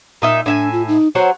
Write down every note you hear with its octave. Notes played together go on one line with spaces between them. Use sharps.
A#2 D#4 E5
A2 D4 E5 G#5
F4
D#4
F#3 F#4 C5 C#5